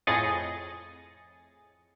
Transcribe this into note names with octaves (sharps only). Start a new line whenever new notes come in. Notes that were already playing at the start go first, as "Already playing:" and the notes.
F2 A2 G#4 D#5 A6 C#7